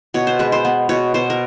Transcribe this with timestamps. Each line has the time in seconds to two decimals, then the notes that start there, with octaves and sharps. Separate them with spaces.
0.14 B2 C#5
0.27 C5
0.39 G#3 B4
0.52 C5
0.65 B3
0.89 B2 C#5
1.14 B2 C5
1.30 A#4